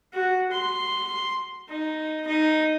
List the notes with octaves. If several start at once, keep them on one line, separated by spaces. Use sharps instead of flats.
F#4
C6
D#4
D#4